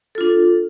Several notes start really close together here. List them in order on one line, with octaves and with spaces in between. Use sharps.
A4 F4 D4